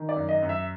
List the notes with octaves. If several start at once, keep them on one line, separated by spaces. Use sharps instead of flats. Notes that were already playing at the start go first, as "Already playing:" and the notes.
Already playing: D#3
D5
F#2
D#5
F#2
E5